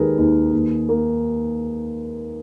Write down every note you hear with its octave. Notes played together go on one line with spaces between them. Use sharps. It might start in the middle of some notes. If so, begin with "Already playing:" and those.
Already playing: D#2 D#3 G#3 G4 G#4 A#4 B4
D#2
D#2
A#3